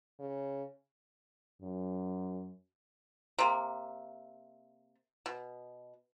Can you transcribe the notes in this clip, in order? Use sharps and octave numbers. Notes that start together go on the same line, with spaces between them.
C#3
F#2
C3 A#3
B2